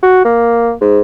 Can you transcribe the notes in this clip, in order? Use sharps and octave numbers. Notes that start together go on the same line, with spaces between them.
F#4
A#3
G#2